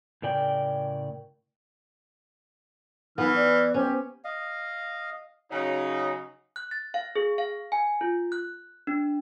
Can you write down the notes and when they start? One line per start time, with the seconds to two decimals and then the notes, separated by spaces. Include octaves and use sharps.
0.22 A2 C#3 A#4 D5 G5
3.18 E3 B3 D#4 F6
3.35 D5
3.74 C#4 G4 C5
4.24 D#5 F5
5.50 C#3 F#3 D#4
6.56 F#6
6.71 A6
6.94 F5
7.16 G#4
7.38 F5
7.72 G#5
8.01 F4
8.32 F#6
8.87 D4